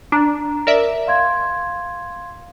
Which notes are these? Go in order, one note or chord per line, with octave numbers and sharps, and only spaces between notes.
D4 A#5
A#4 D5 E5
F5 C6 G#6